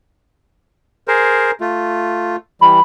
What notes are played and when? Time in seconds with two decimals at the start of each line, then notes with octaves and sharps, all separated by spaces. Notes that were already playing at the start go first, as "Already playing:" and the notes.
1.08 G#4 A#4 C5
1.60 A3 F4
2.61 E3 G3 B5